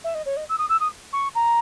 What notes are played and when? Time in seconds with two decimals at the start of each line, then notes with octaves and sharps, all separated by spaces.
0.04 E5
0.15 D#5
0.26 C#5
0.37 D#5
0.49 E6
0.58 D#6
0.69 E6
0.80 D#6
1.13 C#6
1.35 A#5